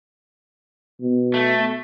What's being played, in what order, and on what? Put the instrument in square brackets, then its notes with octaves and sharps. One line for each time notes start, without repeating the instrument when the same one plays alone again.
[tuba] B2
[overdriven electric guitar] A3